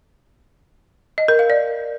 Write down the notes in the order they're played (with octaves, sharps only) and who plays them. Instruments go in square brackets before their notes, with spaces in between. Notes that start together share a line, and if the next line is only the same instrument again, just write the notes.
[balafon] D#5
A#4
F5
D5